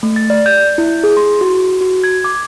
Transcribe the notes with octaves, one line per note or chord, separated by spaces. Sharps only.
A3
A6
D5
G6
E4
G#4
C6
F#4
F#4
G#6
D6